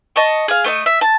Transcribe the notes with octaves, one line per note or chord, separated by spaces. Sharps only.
D#5 A5 C#6
G#4 F5
A3 C#5 D#5
E5
A5